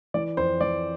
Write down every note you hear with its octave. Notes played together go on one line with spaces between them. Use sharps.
E3 D5
F2 C5
E3 D5